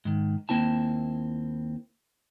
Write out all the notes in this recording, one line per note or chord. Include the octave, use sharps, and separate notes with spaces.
G#2 D#3
D#2 A#3 C4 E4 A5